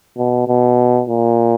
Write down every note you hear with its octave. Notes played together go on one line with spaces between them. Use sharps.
B2
B2
A#2